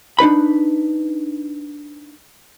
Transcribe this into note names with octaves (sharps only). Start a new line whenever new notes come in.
D4 D#4 B4 B5